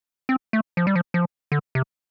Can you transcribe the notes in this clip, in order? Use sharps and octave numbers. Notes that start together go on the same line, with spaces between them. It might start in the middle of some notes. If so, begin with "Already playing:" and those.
C4
A3
F3
G3
F3
F3
D3
C3